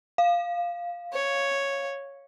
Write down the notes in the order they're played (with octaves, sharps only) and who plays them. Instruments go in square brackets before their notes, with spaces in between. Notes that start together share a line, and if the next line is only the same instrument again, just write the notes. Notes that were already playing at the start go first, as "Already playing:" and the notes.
[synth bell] F5
[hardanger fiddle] C#5